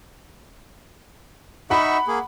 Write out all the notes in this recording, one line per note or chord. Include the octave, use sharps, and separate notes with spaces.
D#4 E5 F#5 B5 C#6
A#3 G#4